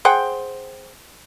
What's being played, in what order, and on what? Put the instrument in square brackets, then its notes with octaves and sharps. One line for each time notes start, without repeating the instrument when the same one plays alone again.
[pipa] G#4 C5 F#5 G5